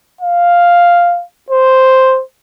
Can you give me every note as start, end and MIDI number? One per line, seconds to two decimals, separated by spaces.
0.21 1.23 77
1.51 2.22 72